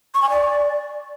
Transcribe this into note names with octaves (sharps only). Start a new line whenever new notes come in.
C#6
G#5
D5